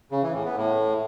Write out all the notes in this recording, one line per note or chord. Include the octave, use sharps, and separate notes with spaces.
C#3
E3
A2
B3
A2